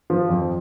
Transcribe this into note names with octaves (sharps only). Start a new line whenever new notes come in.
F3
F2